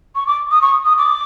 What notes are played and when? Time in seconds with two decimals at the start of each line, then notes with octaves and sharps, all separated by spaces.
0.15 C#6
0.27 D6
0.51 D#6
0.61 C#6
0.85 D#6
0.98 D6